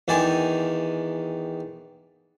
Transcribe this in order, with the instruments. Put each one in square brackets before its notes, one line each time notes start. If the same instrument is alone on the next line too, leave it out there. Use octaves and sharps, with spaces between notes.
[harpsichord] E2 D#3 D5 G#5 C6